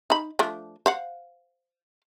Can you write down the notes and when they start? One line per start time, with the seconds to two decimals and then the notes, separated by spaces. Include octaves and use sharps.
0.10 D#4 B5
0.39 F3 A3 D4
0.86 C5 F5 F#5